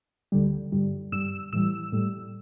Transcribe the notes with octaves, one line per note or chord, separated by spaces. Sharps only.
D2 D3 G3
G2 D3 G3
G2 G3 E6
A2 E3 G3 E6
A2 G3